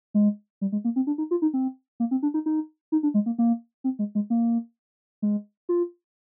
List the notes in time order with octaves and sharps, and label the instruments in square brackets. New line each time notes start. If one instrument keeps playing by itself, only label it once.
[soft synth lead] G#3
G3
G#3
A#3
C4
D4
D#4
F4
D#4
C4
A#3
C4
D4
D#4
D#4
D#4
D4
G#3
A#3
A#3
C4
G#3
G#3
A#3
G#3
F4